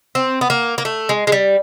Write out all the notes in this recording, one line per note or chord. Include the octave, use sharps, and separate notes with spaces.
C4
B3
A#3
A#3
A3
G#3
G#3
G3